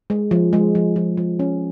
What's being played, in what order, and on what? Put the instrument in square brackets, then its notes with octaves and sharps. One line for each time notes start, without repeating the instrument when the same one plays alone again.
[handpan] G#3
F3
G#3
F3
F3
F3
C#4